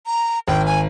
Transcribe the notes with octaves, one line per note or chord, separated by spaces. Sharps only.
A#5
G#1 G5
G#5